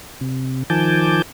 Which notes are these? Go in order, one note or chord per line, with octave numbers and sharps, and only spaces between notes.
C3
D#3 F3 G#5 A5 D6 G6